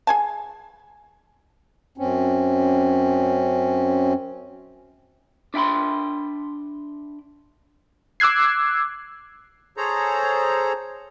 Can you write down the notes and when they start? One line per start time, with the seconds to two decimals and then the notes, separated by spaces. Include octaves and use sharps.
0.07 G#4 G#5 A5
1.98 F#2 C4 C#4
5.54 D4 E5 G5 B5 C6
8.20 D6 E6 F#6 G#6 C7
9.77 G#4 A4 C5 C#5 A#5